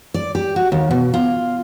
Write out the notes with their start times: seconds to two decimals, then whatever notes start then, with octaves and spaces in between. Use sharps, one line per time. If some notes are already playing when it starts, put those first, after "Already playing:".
0.14 D5
0.35 G4
0.56 F#4
0.72 D#2
0.91 B2
1.14 F4